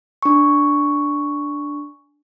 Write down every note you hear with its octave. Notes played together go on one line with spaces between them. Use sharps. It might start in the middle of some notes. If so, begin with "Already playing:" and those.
D4 C#6